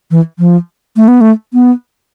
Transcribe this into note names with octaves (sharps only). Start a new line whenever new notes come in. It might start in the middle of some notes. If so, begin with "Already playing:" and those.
E3
F3
A3
B3
A3
B3